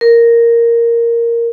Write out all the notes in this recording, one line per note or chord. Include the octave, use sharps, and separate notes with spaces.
A#4